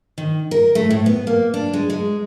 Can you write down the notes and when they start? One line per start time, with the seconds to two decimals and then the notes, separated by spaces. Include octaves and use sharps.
0.18 D#3
0.51 A#4
0.75 A3
0.91 A2
1.06 B3
1.27 A#3
1.54 D4
1.74 G#3
1.90 G#3